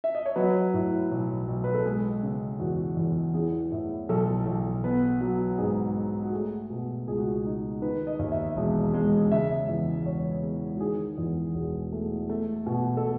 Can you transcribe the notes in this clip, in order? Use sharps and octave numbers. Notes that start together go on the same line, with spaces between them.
E5
D#5
C#5
F#3 B4
A2
B1
B1
B4
A4
G#3 G#4
C#3
E2 F#4
E2
E3 G#4
A2
B1 A4
B1
B3 B4
F#3
G#2 G#4
D#4
F#4
A3 G#4
B2
C#2 G#4
F#4
G#4
D#4
D#3 B4
D#5
D#2
E5
E1
G#3
C#3 E5
E2
E1 C#5
G#3
F#4
D#3 G#4
E2
E1
A3
A3
B2
A4